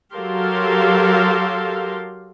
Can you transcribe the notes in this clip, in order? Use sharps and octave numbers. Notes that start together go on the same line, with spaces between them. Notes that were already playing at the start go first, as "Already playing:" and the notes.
F#3 G4 A4 A#4 F5 C6